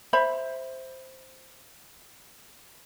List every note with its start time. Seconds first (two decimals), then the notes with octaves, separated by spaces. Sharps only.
0.13 C5 E5 B5